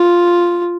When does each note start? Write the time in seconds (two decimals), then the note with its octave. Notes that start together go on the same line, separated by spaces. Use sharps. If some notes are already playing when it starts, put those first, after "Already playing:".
Already playing: F4